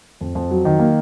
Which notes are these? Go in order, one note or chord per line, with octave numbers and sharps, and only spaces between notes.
F2
F2
F#3
D#3
A#3